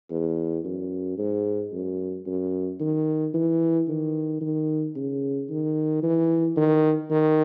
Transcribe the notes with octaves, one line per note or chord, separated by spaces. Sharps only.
E2
F#2
G#2
F#2
F#2
D#3
E3
D#3
D#3
C#3
D#3
E3
D#3
D#3